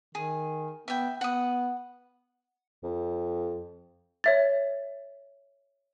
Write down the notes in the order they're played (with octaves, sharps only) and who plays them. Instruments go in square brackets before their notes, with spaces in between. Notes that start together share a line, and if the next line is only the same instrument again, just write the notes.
[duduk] D#3 [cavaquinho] G#4
[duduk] B3 [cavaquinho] E5 G5
[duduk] B3 [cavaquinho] F#5 D#6
[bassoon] F2
[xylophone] C#5 E5 A6